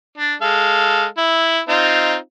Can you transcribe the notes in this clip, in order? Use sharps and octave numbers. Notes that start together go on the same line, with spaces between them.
D4
G#3 A4 F5
E4
C4 D#4 F4